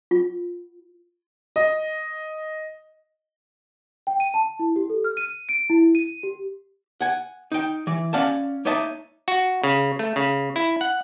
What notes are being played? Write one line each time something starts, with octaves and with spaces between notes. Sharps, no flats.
F4
D#5
G5
D#7
A5
E4
G4
A4
F6
D#7
D7
E4
D#7
G4
F#5 G#5
D#4 G5
E3
C#4 D5 F5 F#5 A5
A#3 D#4 C#5 D#5 E5 A5
F#4
C#3
A3
C#3
E4
F#5